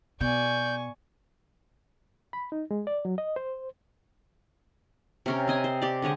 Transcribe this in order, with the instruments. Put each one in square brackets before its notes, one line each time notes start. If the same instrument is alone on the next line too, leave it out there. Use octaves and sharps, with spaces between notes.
[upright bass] B2 [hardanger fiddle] D5 [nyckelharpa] G#5 C#6 [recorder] G6
[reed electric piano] B5
D#4
G#3
D5
F#3
D#5
C5
[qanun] C3 C#4 A#4
C4 D#5 G#5
C5
G4 D5
D3 G#3 C#5 D#5